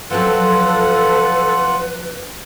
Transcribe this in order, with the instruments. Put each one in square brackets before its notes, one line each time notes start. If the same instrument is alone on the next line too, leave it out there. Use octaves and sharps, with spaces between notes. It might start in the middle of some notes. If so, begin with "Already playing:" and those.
[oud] F3 F#3 C4 [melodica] F4 F#5 [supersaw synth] A4 [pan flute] B4